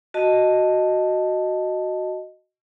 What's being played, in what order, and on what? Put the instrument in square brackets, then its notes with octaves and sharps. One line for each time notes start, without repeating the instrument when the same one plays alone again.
[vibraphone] F#4 D#5 A5